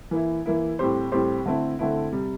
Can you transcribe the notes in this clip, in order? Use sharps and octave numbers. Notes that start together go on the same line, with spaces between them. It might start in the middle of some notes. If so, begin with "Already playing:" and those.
E3 A#3 E4
E3 A#3 E4
A2 G3 C4 G4 C5
A2 G3 C4 G4 C5
D3 A3 C4 E4
D3 A3 C4 E4
C3 G3